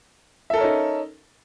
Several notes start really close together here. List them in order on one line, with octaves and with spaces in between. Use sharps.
E5 A4 A#4 C#4 D#4